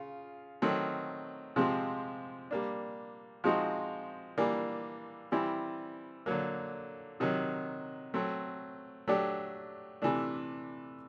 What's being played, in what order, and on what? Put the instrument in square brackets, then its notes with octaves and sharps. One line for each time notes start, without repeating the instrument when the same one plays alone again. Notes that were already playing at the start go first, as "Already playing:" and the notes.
Already playing: [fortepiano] C#3 F4
D#3 F#3 A3 C4
C3 F3 G#3 C4
G3 A#3 D4
F3 G#3 C4 D#4 F#4
E3 G3 A#3 D4
E3 G3 C4 E4 G4
D3 F#3 A#3
C3 D#3 F#3
F#3 A3 C4
F#3 A3 D4 G4
C3 E3 A3 D4